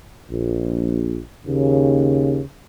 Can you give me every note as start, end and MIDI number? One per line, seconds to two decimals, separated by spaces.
0.31 1.22 34
1.47 2.42 39
1.47 2.42 49